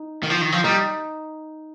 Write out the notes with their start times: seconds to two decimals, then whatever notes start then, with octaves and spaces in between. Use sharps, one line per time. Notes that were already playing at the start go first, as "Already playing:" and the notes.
Already playing: D#4
0.23 D#3
0.30 F3
0.41 D#3
0.52 F3
0.64 G3 D#4